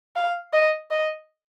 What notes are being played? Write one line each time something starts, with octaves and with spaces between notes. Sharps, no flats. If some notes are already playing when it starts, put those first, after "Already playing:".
F5
D#5
D#5